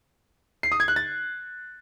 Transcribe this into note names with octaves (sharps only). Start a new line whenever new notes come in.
C7
D#6
G#6
F#6
A6